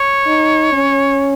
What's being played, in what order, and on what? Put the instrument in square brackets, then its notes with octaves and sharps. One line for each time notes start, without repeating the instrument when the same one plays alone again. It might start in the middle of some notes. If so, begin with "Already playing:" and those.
Already playing: [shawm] C#5
[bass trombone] D#4
C#4